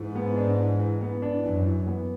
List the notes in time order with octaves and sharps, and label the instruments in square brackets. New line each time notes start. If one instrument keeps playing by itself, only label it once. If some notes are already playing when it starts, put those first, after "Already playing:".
Already playing: [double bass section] G#2 [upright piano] E3
[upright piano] B3
D4
E3
E3
B3
D4
[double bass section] F#2 [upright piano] E3
[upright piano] E3
B3